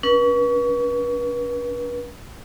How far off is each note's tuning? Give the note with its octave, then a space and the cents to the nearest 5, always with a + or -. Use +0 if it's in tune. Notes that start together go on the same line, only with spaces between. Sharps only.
C#4 +30 B4 -35